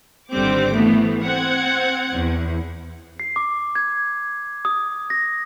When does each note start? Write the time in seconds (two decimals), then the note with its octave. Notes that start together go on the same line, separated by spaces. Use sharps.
0.31 G#1 D3 G3 C4 D6
0.73 E3 A3 B3
1.22 C4 F#5 G#6
2.13 E2
3.20 C7
3.36 D6
3.75 G#6
4.65 D#6
5.10 A#6